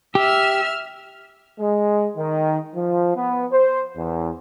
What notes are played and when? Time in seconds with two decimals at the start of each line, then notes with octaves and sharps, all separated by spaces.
0.15 G4 E5 E6 F6
1.59 G#3
2.16 D#3
2.75 F3
3.16 B3
3.52 C5
3.96 E2